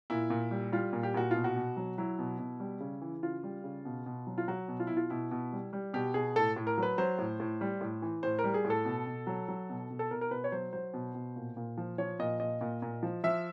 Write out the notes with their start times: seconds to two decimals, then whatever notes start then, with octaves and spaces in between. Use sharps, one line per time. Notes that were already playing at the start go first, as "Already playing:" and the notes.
0.10 A#2 E4
0.30 A#2
0.51 G3
0.72 G3 F4
0.93 A#2
1.03 G4
1.14 A#2 F#4
1.31 B2 F4
1.44 F#4
1.56 B2
1.77 F#3
1.98 F#3 E4
2.19 B2
2.39 B2
2.60 G3
2.80 C#3
3.01 E3
3.23 C#3 F4
3.43 G3
3.64 C#3
3.85 B2
4.06 B2
4.27 F#3
4.38 F4
4.48 F#3 F#4
4.68 B2
4.80 F4
4.87 B2 E4
4.97 F4
5.10 B2 E4
5.31 B2
5.53 G3
5.73 G3
5.94 B2 G4
6.14 B2 G#4
6.36 A2 A4
6.56 A2
6.67 A#4
6.78 F#3 B4
6.98 F#3 C5
7.18 A2
7.40 A2
7.61 G3
7.81 A2
8.02 E3
8.23 A2 C5
8.39 A#4
8.44 G3
8.54 G#4
8.65 A2
8.70 A4
8.85 B2
9.07 B2
9.27 F#3
9.48 F#3
9.70 B2
9.90 B2
9.99 A4
10.11 B2 A#4
10.21 A#4
10.31 B2 B4
10.44 C#5
10.52 F#3 C5
10.73 F#3 C5
10.94 B2
11.15 B2
11.36 A#2
11.57 A#2
11.77 F3
11.98 F3 C#5
12.19 A#2 D#5
12.40 A#2 D#5
12.61 A#2
12.82 A#2
13.03 F3
13.24 F3 E5